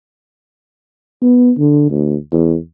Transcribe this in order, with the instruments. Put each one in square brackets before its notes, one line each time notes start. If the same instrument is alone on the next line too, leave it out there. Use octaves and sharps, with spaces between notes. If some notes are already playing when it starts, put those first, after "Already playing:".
[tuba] B3
D3
D2
E2